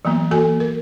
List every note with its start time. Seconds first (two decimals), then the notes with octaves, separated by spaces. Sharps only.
0.05 E3 F#3 A#3 B3
0.31 E3 A#3 F#4 A4 G#5
0.60 A#4